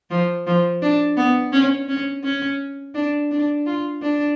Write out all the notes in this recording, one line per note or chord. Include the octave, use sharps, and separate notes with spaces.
F3
F3
D4
B3
C#4
C#4
C#4
D4
D4
F4
D4